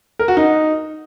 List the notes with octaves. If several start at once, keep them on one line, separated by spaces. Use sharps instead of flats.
A#4
F#4
D#4